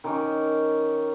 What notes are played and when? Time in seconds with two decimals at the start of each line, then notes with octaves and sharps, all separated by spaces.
0.04 D#3 C#4 D6